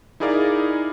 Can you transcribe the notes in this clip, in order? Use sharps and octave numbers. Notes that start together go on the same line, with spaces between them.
D#4 E4 G#4 A#4 D5 F5